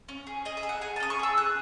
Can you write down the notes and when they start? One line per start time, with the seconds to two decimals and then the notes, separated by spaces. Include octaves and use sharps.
0.08 C#4
0.27 G#4
0.45 G#4 D#5
0.57 E5
0.63 G#4
0.69 F#5
0.81 G#4 G#5
0.96 A5
1.00 C#4 D#6
1.10 C#6
1.19 G#4 E6
1.37 G#4 F#6